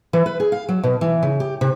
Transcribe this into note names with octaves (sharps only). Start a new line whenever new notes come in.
E3
B4
G#4
F5
F#3
B2
E3
C#3
G4
C3